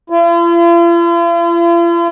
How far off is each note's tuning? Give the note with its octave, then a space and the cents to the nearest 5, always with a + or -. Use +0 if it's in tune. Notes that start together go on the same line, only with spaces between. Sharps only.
F4 -45